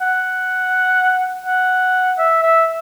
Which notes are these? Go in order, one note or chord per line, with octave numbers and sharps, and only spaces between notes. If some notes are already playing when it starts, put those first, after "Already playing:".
F#5
F#5
E5
E5